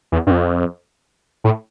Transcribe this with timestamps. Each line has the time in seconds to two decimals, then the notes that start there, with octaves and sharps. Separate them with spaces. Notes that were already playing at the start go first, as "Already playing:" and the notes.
0.12 E2
0.27 G2
0.31 F2
1.44 A2